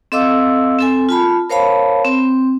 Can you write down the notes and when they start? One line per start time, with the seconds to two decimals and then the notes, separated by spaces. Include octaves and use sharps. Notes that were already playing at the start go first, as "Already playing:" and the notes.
0.12 C4 A4 D#5 F5 D6 E6
0.79 C4 A4 G#5
1.09 F4 A5 B5
1.50 A#4 C5 C#5 F5 A5 B5
2.05 C4